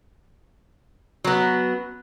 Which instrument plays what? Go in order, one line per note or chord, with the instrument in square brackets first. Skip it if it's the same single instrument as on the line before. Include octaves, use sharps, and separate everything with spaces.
[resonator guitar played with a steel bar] F#3 B3